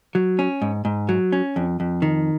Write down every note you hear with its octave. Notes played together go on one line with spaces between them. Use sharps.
F#3
C#4
G#2
G#2
F#3
C#4
F2
F2
D#3